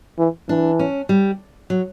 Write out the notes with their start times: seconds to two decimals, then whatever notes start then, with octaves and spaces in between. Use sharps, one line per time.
0.18 E3
0.48 E3 D4
0.79 C#4
1.09 G3
1.70 F#3